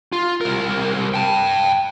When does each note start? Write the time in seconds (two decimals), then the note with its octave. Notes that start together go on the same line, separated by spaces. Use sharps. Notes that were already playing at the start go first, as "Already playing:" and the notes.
0.13 F4
0.41 C2 A#4
1.14 G5 A5